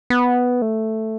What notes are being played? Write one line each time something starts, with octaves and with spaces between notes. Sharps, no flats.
B3
A3